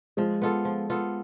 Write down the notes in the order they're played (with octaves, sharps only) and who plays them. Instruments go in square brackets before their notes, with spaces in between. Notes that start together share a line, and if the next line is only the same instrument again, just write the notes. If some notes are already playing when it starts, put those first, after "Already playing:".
[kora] F3 [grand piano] G#3
[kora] B3 F4 A4
F3
B3 F4 A4